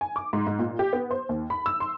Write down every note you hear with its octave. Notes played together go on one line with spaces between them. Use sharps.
G#5
D6
G#2
G#2
A#2
G4
B3
C5
D#2
B5
E6
C6